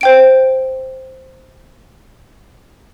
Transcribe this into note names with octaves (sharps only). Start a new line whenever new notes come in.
C5 G5 D7